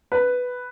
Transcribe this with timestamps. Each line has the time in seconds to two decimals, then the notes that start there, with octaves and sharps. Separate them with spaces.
0.12 B4